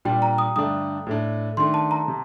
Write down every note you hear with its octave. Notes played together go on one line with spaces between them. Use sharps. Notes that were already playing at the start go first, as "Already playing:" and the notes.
A#2 G3 D4 G5
A#5
D#6
G2 D3 A3 D4 D#6
A2 A3 D4
D#3 A3 D4 C6
A5
A#5
C3